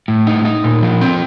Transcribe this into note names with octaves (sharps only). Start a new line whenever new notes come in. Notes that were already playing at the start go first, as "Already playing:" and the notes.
A2
D#4
D#4
A#2
F3
C4